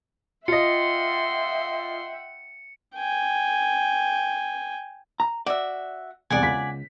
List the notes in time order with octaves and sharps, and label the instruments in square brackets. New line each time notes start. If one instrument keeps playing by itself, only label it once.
[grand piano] F4 D#5 [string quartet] E5 F#5 G5 [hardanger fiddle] C6 [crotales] C#7
[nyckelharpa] G5 G#5
[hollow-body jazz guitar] A#5
[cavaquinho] F#4 E5 [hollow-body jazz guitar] D5
[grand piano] E1 C2 [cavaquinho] D5 F#5 G#5
[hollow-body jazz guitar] C#2 [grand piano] B6